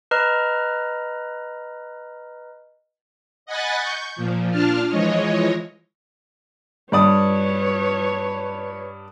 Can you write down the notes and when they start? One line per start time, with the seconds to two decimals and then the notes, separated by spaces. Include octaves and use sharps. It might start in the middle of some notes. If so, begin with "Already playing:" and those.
0.11 B4 D#5 A#5 F6
3.46 D#5 F#5 G#5 B5 F#6 A6
3.79 C#6 G6
4.16 A#2 F3
4.51 A#2 D4 F4 A5 F6
4.88 E3 F3 G#3 C#5 D#5
6.92 G2 B4 C#5 D5 D#6